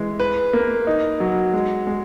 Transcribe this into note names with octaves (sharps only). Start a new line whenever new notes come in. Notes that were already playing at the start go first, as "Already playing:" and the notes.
Already playing: E3 G#3
B4
A#3
D#4
F#3
G#3
G#3